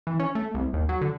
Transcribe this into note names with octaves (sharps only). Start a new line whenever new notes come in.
E3
C#4
A3
C2
D#2
F#3
D3